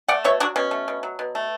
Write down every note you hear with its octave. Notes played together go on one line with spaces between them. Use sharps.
A3 D5 F#5
B2 C#5 E5
F#3 D4 F#4
B2 C#4
A3
B2
F#3
B2
A3